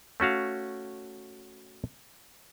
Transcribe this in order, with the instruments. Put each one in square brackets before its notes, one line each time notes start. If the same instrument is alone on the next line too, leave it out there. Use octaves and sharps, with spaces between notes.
[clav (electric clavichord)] A3 C#4 F#4 F5